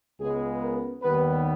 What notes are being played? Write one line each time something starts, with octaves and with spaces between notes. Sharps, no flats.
C#2 C#3 G#3 B3 G#4
A#4
D#2 D#3 G3 B3 B4